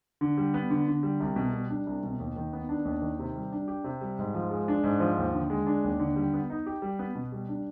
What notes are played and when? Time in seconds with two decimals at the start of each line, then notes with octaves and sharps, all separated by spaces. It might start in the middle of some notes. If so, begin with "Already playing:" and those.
0.21 D3
0.38 G3
0.54 B3
0.70 D3
0.88 D3
1.03 G3
1.20 C2
1.36 B2
1.53 G3
1.70 D4
1.87 C2
2.03 B2
2.20 D#2
2.36 D#3
2.53 B3
2.69 D4
2.85 D#2
3.02 D#3
3.19 C3
3.36 G3
3.52 D4
3.68 G4
3.84 C3
4.01 G3
4.19 G#2
4.34 F3
4.51 G#3
4.68 D4
4.84 G#2
5.00 F3
5.18 D#2
5.34 D3
5.50 G#3
5.67 D4
5.84 D#2
5.99 D3
6.16 G3
6.33 B3
6.50 D#4
6.66 G4
6.82 G3
6.99 B3
7.15 B2
7.32 G3
7.49 D4